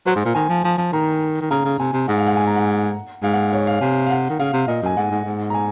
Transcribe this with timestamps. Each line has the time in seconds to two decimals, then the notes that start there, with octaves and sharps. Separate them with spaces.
0.06 F#3 C5
0.16 G#2
0.25 A#2
0.35 D#3 G#5
0.49 F3
0.64 F3
0.78 F3
0.93 D#3 A#5
1.41 D#3
1.51 C#3 A#5
1.65 C#3
1.79 C3 G#5
1.93 C3
2.08 G#2 F#5
2.18 F5
2.27 F#5
2.37 G#5
2.47 A#5
2.56 F#5
3.23 G#2 F5
3.34 F#5
3.53 C#5
3.67 F5
3.81 C3 G#5
4.06 F5
4.10 F#5
4.30 D#3
4.39 C#3 F5
4.53 C3
4.68 A#2 D#5
4.82 F#2 G#5
4.97 G#2 F#5
5.11 G#2
5.25 G#2
5.50 A#5
5.54 G#5